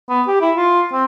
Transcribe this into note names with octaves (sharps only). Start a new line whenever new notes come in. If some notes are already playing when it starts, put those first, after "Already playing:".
B3
G4
E4
F4
C4